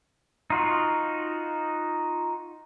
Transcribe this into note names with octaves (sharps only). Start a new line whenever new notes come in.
D#4 F4 F#4